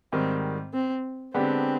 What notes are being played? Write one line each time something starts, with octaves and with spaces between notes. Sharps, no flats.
G#2 D#3 G3 C4
C4
D3 G#3 B3 C4 D4 G4